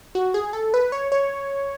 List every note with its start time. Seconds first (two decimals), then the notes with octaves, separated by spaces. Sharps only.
0.15 F#4
0.34 G#4
0.53 A4
0.74 B4
0.92 C#5
1.12 C#5